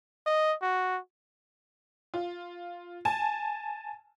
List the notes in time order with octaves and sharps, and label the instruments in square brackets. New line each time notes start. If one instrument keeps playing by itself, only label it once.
[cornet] D#5
F#4
[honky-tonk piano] F4
G#5 A5